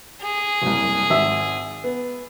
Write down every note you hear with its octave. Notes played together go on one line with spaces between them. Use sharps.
G#4
F#1 C2
G#1 E5 E6
B3